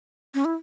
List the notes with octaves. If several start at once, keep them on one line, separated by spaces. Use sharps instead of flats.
C#4
E4